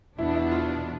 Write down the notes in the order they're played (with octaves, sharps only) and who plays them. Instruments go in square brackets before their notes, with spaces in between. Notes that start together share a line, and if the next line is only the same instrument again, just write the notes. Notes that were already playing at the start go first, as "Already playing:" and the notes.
[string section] E2 B2 B3 D4 [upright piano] E4
[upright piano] E4
F4